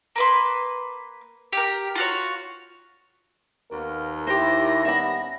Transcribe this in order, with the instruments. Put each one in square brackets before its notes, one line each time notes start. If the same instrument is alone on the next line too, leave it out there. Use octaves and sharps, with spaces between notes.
[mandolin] A#3 B4 C6
G4 A#4
F4 F#4 C#5
[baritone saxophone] D#2 [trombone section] A#3 B3 A#4
[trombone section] E4 [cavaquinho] G4 C5 [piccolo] A#6
[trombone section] G3 B3 C#4 [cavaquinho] E5 B5